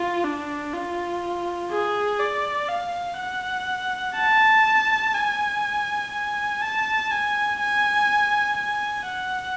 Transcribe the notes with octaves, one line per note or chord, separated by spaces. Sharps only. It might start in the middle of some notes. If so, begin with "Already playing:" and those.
Already playing: F4
D4
F4
G#4
D5
F5
F#5
A5
G#5
G#5
A5
G#5
G#5
G#5
F#5